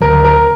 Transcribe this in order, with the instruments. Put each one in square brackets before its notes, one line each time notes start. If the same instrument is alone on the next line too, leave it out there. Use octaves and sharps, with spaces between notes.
[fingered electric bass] D2 D3 F#3 [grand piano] A#4
[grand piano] A#4